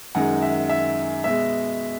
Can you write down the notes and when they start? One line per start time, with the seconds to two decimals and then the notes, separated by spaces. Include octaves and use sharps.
0.15 F#2 D#3 G#3 F#5
0.42 E5
0.69 E5
1.24 B2 G#3 E5